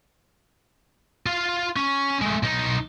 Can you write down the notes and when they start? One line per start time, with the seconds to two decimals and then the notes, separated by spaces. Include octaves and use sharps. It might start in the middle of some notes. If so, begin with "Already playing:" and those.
1.26 F4 F5
1.76 C#4
2.22 G#3 A3
2.43 B1 D#4